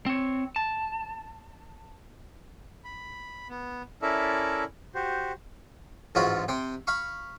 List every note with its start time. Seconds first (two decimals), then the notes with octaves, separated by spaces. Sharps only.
0.06 C4 C#5
0.56 A5
2.84 B5
3.49 B3
4.02 C#4 E4 A4 A#4 D5 E5
4.95 F#4 G4 C5
6.15 A1 G#2 F#3 F4 F#4 B5
6.48 C3 G5 C6
6.87 F5 B5 C#6